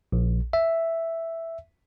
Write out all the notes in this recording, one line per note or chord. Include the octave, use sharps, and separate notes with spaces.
A#1
E5